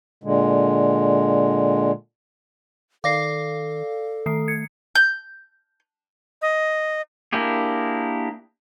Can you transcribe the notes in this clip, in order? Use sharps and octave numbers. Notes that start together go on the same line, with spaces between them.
A#2 D3 G#3
D#3 A4 D5 F5 D6 A#6 C7
D#3 A3 C7
G#6 C#7
G6
D#5
A#3 D4 E4 G4 G#4